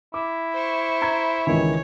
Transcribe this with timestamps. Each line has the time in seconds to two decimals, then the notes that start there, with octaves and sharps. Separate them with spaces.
0.14 E4 D6
0.53 C5 C#6
1.02 A#5 B5 G#6
1.47 C#2 D#3 E3 C#5